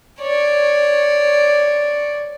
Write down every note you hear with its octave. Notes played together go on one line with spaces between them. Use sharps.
C#5 D5